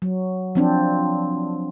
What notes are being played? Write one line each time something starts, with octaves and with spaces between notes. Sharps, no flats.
F#3
F3 C4 D4